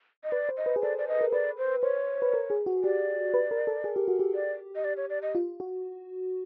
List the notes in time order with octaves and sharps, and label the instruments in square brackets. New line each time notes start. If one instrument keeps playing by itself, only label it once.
[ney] D#5
[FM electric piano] B4 [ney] D5
[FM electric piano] C5
[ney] D#5
[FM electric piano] B4
G#4
[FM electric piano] A4 [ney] D5
[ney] D5
D#5
[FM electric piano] A#4
[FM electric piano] B4 [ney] D5
[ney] C5
[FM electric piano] C5 [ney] C#5
[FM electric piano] B4
A#4
G#4
F#4
[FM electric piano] G4 [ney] D5
[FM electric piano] B4
A#4
A4
G#4
G4
F#4
G4
[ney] D5
D#5
D5
C#5
D5
D#5
[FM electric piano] F4
F#4